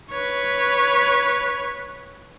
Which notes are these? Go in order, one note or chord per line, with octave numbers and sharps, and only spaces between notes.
B4 C#5